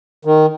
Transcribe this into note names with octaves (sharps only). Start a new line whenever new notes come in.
D#3